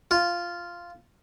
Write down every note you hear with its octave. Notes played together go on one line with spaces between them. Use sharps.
F4